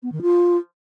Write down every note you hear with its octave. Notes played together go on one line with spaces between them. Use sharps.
B3
D#3
F4